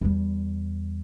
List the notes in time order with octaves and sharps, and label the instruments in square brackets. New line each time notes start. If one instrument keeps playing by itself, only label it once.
[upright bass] E2 G3